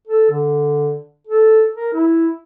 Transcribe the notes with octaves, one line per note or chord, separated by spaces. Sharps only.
A4
D3
A4
A#4
E4